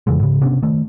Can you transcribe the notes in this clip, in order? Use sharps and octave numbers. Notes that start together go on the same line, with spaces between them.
F2 C#3 E3 G#3
G#2 C#3
C3 B3 C#4 D4
D#3 A3